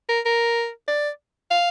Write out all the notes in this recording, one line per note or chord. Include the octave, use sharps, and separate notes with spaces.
A#4
A#4
D5
F5